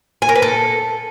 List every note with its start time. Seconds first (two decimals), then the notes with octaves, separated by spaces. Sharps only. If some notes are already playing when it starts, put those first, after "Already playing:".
0.22 G#5
0.29 A#4
0.36 B4
0.42 A4